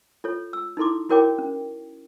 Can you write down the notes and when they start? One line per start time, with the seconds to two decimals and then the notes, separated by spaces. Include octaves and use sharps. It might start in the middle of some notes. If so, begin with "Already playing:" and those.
0.24 F4 A4 C#5
0.53 E6
0.77 D#4 E4 A4 C6 D6
1.10 E4 F#4 A#4 C#5 G5 D6
1.38 C#4